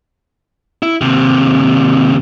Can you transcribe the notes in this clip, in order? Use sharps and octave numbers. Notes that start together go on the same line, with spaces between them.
E4
D#2 C3